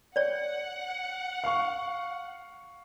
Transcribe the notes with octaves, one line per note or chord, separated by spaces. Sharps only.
C#5 D5 F#5
F5 C#6